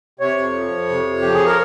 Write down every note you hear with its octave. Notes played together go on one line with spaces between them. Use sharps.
C3 C#5
F2
F3
F2
C3
F2
F3 G4
G#4
A#4